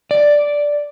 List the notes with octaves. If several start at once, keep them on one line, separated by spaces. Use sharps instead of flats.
D5